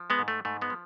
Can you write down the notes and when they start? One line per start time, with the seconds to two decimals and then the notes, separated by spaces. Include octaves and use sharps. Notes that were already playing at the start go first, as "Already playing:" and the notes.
Already playing: F3
0.10 G#3 B3
0.19 G#2
0.28 A3
0.45 G#2 A3
0.62 G#3 B3
0.70 F3